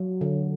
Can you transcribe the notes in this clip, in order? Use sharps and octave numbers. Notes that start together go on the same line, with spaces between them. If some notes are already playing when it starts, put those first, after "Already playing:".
Already playing: F#3
D3